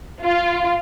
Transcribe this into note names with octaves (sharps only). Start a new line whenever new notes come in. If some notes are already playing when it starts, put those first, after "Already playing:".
F4